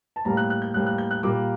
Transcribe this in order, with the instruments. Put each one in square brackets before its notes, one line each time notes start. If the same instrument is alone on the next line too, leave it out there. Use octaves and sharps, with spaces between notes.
[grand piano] A5
A2 G3 A#3 A#5
F#6
F#6
G6
A2 G3 A#3 F#6
F#6
G6
F#6
A#2 G3 A#3 D6